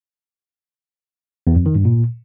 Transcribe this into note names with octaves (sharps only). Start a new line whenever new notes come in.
E2
F2
D#3
G2
A#2